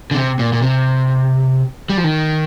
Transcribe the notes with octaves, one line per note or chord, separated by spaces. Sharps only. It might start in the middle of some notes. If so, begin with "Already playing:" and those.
D3
C3
A#2
A#2
C3
G3
F3
D#3